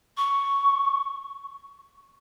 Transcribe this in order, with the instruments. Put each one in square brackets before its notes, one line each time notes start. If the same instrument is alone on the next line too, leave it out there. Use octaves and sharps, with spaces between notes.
[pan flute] C#6